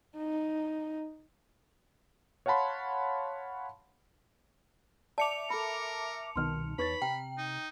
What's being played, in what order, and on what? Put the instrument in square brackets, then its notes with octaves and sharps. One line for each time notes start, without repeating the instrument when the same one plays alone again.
[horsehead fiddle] D#4
[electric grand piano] C#5 F5 F#5 A5 B5 C6
[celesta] D5 [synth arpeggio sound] E5 D6 [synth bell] A5 C#7 F7
[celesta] A4 B5 [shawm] A#4
[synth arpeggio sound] C2 B2 D#3 [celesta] C6 F6
[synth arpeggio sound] E2 C#5 A6 [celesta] D#4 B4 C#6 [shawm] B5
[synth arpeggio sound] C3 [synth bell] G5 [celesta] A#5
[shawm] D#4